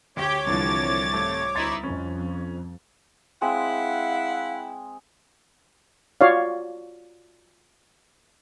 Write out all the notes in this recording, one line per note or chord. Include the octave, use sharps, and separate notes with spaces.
D2 G4 C#5 G5 D6
C2 D3 E3 F3 A6
G#1 A3
D2 D#4 E4 C6 A6
F2 C#4
G#3 C4 E4 F5 F#5
F4 F#4 C#5 D5 F5